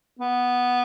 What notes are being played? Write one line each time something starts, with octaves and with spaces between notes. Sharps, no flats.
B3